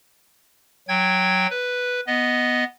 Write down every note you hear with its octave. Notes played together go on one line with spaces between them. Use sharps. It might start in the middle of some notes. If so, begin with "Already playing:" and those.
F#3 G5 G#6
B4
B3 D#5